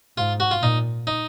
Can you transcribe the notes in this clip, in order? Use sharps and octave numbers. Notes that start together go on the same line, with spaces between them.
G#2 F4
F#4
F4
A#2 D#4
D#4